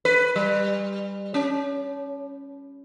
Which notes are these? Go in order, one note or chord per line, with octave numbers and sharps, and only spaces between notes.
B4
G3
C#4